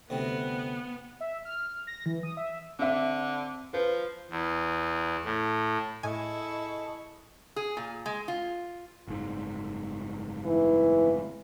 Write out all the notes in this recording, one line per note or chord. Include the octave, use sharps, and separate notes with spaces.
D2 C3 G3 B3
E5
F6
A#6
E3
D#6
E5
D3 C4 E5
F3 B4
E2
A2
A2 E4 G#4 A4 D#5 G#5 C#6
G#4
A#2
G#3
F4
F#1 G#2
E3